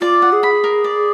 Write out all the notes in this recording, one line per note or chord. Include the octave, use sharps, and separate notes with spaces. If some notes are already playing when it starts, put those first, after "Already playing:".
F4 D5
F#5
G#4
B5
A#4
D5